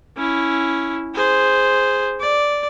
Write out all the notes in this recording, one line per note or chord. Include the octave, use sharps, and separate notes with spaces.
C#4 E4
G#4 C5
D5